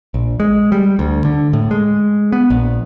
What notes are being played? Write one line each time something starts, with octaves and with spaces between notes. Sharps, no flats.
A#1
G#3
G3
D2
D3
A2
G#3
B3
A#1